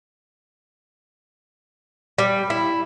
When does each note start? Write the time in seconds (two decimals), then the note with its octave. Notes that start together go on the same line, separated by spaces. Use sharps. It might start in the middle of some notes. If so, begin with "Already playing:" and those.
2.18 G3
2.50 E4